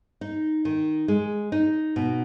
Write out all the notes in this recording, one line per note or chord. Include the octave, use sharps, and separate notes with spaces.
D#4
D#3
G#3
D#4
B2